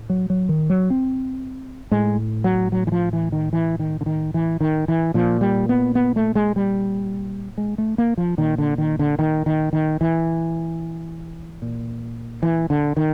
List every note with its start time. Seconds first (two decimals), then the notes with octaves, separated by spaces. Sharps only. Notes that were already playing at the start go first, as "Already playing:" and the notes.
Already playing: A2
0.10 F#3
0.30 F#3
0.49 D#3
0.70 F#3
0.90 C4
1.91 A2 G#3
2.44 F#3
2.72 F#3
2.87 E3
2.92 F3
3.13 E3
3.32 D#3
3.53 E3
3.79 D#3
4.01 D3
4.06 D#3
4.34 E3
4.61 D#3
4.88 E3
5.14 A#2 F3
5.41 G3
5.69 B3
5.95 B3
6.16 A3
6.35 G#3
6.56 G3
7.58 G#3
7.78 A3
7.98 A#3
8.18 F3
8.38 A#2 D#3
8.58 D3
8.78 D#3
8.99 D3
9.19 D#3
9.46 D#3
9.73 D#3
10.01 E3
11.62 A#2
12.43 E3
12.70 D3
12.97 D#3